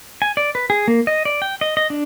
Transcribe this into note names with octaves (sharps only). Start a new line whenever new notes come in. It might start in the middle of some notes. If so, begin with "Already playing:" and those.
G#5
D5
B4
G#4
A#3
D#5
D5
G5
D#5
D#5
D4